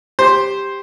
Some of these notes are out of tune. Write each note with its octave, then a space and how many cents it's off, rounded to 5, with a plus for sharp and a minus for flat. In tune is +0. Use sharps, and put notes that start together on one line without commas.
G4 +10 C5 +0